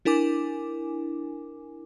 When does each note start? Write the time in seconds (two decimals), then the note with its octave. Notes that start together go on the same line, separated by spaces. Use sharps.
0.05 D4 E4 A#4 G#5 D6